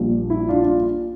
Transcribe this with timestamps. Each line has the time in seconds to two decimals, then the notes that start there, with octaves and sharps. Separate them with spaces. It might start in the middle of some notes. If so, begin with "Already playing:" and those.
Already playing: A#1 A#2 G3
0.30 E4
0.49 D4 F4
0.63 D4 F4